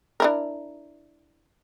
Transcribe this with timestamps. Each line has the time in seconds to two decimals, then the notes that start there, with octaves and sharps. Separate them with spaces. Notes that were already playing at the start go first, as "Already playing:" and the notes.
0.20 D4 E4 A#4